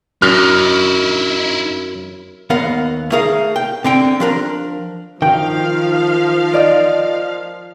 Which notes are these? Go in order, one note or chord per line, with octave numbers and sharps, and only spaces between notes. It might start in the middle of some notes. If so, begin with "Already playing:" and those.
F#2 D#4 E4 F6
D#2 B3 A#4 F5 F#5
A3 G#4 A#4 F5
G5
D3 C4 G5
F3 D4 A#4
D#3 F3 F5 G5
A#4 D5 D#5